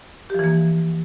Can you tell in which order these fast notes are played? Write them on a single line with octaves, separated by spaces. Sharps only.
G4 F3 E3 A#3